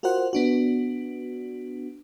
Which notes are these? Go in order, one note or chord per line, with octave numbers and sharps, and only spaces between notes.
F4 F#4 A#4 C5 F#5
B3 D4 F#4